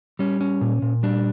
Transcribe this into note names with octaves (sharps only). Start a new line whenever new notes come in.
G3 C#4
C#4
A#2
A#2
G3 D4